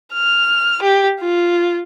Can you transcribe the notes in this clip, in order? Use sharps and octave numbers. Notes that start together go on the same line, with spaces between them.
F6
G4
F4